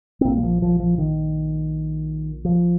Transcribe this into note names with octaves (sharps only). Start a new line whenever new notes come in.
C4
A#1 A#2 A#3
G3
F3
F3
F3
D#3
F3